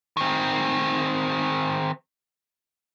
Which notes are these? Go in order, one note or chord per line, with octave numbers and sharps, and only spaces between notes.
D#3 C4